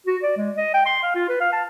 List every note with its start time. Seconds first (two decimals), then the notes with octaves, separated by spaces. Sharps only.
0.07 F#4
0.23 D5
0.37 G#3
0.57 D#5
0.74 G5
0.86 C6
1.03 F5
1.15 F4
1.29 B4
1.40 F5
1.53 A5